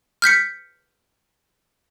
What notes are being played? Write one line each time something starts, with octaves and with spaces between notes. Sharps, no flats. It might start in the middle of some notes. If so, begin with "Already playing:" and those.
F6 G6 B6 C#7